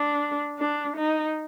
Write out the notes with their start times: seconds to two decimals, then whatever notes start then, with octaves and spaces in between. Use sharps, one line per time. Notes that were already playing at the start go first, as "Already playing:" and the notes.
Already playing: D4
0.59 D4
0.97 D#4